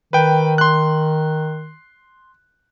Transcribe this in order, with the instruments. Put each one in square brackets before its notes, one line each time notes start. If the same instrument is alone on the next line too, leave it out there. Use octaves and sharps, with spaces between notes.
[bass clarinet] D#3 [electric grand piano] B4 G5
[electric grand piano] C6 F#6